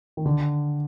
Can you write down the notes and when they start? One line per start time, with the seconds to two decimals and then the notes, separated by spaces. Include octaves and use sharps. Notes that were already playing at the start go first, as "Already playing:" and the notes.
0.17 D#3
0.26 D3